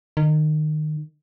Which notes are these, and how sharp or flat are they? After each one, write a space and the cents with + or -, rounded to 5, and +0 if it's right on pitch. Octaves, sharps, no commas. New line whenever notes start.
D#3 -25